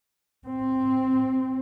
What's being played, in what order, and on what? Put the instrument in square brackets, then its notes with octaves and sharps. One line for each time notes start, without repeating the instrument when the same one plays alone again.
[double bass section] C4